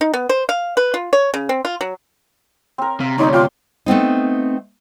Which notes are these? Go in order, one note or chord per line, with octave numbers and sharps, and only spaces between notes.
D#4
B3
C5
F5
B4
F4
C#5
C#3
C4
F4
F#3
C4 A#4
C3 F5
D2 C3 D#4 C#5 D5 C6
F4 G5 C6 D6
A3 B3 C4 D#4